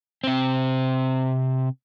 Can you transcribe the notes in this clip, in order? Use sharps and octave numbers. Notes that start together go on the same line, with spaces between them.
C3 C4